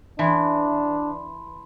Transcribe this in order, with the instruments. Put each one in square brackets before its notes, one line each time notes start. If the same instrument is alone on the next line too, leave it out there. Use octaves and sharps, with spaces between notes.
[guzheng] E3 [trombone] D4 [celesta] A5 B5 C6